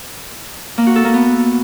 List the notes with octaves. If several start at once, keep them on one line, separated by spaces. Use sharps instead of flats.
A#3
F#4
A4
A#3
B3